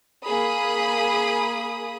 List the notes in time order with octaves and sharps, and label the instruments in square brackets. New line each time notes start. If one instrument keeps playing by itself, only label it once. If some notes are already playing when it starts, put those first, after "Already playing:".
[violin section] A#3 G#4 B5 D#6